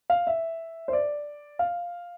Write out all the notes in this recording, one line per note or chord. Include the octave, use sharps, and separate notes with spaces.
F5
E5
C5
D5
F5